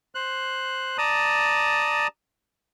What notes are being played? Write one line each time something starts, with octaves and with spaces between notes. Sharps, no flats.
C5 F#6
D5 A5 A#5 D#6